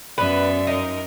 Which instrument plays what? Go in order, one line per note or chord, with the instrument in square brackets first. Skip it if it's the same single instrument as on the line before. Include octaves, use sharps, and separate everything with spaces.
[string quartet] F#2 [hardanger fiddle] B3 E5 [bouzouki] B4 [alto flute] D5
[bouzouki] D#4 [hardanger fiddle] A#4 D#5